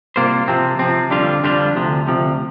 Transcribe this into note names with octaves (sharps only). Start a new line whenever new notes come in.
C2 C3 A#3 F4 C5
C3 F3 C4
C3 F3 C4
F2 D3 G3 D4 F4
F2 D3 G3 D4 F4
D2 C3 F3
D2 C3 F3